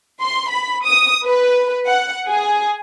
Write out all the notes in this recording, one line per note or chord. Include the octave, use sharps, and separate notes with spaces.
C6
B5
D#6
B4
F#5
G#4